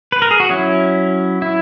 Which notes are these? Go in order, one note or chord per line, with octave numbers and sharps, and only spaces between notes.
B4
A#4
G#4
F#4
F#3 C#4 E4
E4